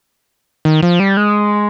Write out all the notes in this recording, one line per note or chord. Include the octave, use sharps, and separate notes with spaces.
D#3
F3
G3
G#3